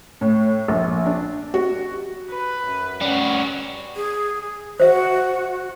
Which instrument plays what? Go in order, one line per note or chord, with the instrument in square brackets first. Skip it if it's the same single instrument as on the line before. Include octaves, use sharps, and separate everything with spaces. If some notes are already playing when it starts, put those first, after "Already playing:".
[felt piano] A2
A#1
D4
F#4
[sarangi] B4
[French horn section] F#2
[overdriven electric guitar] G3 F#4 [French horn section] C#4
[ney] G#4
[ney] F#4 [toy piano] C5 E5